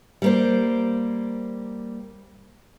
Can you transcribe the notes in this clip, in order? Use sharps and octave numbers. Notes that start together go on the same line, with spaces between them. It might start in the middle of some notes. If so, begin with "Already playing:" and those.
G3 A#3 C5